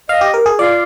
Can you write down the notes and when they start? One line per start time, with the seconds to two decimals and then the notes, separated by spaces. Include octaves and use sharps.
0.09 D#5 F5
0.21 G4
0.34 A#4
0.46 G#4
0.58 F4 D5